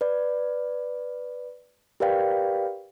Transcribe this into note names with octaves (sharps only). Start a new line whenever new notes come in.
B4 D5
G4 A#4 B4 D5 F5 G5